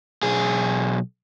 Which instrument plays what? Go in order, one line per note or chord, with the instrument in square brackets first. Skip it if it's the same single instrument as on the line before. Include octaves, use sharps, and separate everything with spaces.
[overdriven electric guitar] B1 G#4